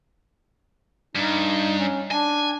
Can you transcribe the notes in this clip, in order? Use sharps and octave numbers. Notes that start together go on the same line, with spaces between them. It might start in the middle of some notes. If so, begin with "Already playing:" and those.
G2 D#4
C#4
D4 G#5